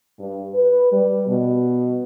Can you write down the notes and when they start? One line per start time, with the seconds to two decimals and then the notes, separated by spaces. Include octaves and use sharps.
0.19 G2
0.54 B4
0.92 G3
1.27 B2